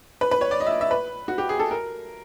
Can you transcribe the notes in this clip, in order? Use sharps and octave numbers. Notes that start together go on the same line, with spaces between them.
B4
B4
C#5
D5
D#5
E5
D#5
E5
B4
F#4
G4
G#4
A4
A#4